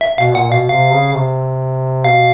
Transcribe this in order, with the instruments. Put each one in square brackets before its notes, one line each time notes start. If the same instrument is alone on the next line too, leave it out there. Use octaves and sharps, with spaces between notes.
[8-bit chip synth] E5
[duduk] B2 [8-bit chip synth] F5
[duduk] A#2 [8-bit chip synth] F#5
[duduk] B2 [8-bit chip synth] F5
[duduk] C3 [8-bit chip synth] F5
[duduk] C#3
C3
[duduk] B2 [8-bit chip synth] F5